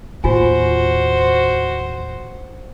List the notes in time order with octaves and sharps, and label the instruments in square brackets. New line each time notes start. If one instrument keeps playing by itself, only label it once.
[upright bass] D#2 A2 [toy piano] F4 G#5 [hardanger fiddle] F#4 C5